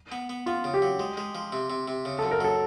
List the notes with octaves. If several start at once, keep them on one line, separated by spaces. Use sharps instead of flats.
B3
B3
B3 F4
C#3
G4
F#3
G#3
G#3
F3
C3
C3
C3
C#3
F#2 A4
A#4
F#3 A4